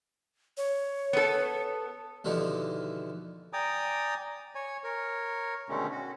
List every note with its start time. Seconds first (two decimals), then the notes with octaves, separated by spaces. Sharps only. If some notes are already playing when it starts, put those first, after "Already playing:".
0.57 C#5
1.13 B3 A4
2.24 D#2 B2 D3 E3 F3
3.53 D5 G5 G#5 A#5 D6 D#6
4.55 C#5 G#5
4.84 A#4 C#5
5.69 B2 D3 D#3 G#3 A3 C#4
5.91 C#4 F#4